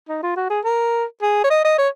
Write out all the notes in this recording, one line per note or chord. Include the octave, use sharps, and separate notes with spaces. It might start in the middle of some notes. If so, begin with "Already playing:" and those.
D#4
F4
F#4
G#4
A#4
G#4
C#5
D#5
D#5
C#5